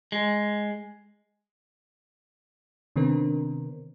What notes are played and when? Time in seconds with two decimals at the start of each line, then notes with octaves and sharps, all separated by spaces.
0.12 G#3
2.96 C3 D#3 B3 C4 D4 A#4